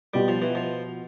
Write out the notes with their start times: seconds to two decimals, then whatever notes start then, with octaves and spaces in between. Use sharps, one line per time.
0.14 B2 G3 B3 F4
0.28 F3
0.42 E3
0.55 F3